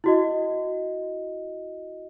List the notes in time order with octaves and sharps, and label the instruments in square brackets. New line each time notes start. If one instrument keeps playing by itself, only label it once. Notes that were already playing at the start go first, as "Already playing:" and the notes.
[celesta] E4 F#4 D#5